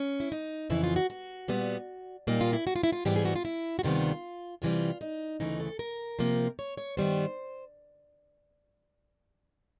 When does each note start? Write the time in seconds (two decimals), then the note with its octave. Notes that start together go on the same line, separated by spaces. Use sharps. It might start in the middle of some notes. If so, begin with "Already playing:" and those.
Already playing: C#4
0.20 E4
0.32 D#4
0.70 F2 C#3 E3 E4
0.84 F4
0.96 F#4
1.10 F#4
1.48 A#2 G3 B3
2.27 A#2 G3 A#3 D#4
2.41 F4
2.53 E4
2.67 F#4
2.76 F4
2.84 E4
2.92 F4
3.05 G#2 E3 G3 B3 G4
3.16 G#4
3.25 F#4
3.36 F4
3.45 E4
3.79 F#4
3.83 D2 C3 D#3 G3 B3 F4
4.62 C3 E3 G3 F4
5.01 D#4
5.40 D2 C#3 E3 A3 D#4
5.60 A4
5.79 A#4
6.19 C3 F3 A#3
6.59 C#5
6.77 C#5
6.97 G2 D#3 G3 B3 C5